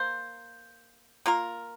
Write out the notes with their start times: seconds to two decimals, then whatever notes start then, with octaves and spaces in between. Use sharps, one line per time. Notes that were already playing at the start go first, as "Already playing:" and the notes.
Already playing: A#3 C5
1.26 A#3 F4 A#4